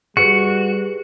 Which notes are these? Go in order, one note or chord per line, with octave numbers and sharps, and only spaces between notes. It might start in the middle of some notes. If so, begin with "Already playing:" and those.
G3 F#4 G#4 B4 C#7